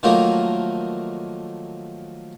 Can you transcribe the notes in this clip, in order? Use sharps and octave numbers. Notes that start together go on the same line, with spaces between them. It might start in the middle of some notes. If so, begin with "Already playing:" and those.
D#3 F3 F#3 A3 A#3